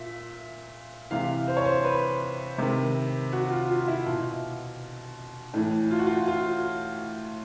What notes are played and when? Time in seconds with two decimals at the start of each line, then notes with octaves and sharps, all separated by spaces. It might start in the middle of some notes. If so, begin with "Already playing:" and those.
Already playing: A#2 E5
1.11 C3 E3 F5
1.48 C5
1.57 C#5
1.66 C5
1.84 B4
2.58 C3 D#3
3.33 F#4
3.51 F4
3.69 F4
3.88 E4
4.06 B2 F4
5.54 A2 E3
5.91 F4
5.99 F#4
6.07 F4
6.28 F4